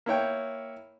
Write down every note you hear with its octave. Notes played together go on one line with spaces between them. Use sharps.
A#3 E4 C#5 G5